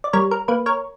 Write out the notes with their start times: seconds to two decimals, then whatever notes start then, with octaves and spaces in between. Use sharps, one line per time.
0.04 D5
0.13 G3 A#4 C#5
0.31 A#4
0.48 A#3 B4
0.66 A#4 C#5